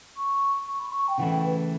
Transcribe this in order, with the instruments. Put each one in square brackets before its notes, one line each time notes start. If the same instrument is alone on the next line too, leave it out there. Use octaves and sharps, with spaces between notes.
[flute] C#6
C#6
B5
C#6
G5
[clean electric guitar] C#3 E3 A3 E4 [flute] F#5
[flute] G5
B4